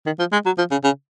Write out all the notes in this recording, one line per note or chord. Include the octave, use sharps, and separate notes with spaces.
D#3
F3
G#3
F#3
F3
C#3
C#3